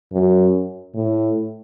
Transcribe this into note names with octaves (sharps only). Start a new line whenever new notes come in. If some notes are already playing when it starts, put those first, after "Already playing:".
F#2
A2